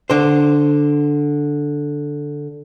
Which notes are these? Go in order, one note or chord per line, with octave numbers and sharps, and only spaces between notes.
D3 C5